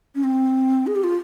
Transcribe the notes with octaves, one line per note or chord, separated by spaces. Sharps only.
C#4
C4
G#4
G4
F4